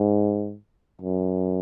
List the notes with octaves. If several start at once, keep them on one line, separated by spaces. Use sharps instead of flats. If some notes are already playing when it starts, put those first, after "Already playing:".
Already playing: G#2
F#2